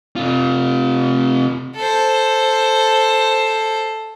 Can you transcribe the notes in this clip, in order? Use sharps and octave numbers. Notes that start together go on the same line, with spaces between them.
C3 F4
A4 C5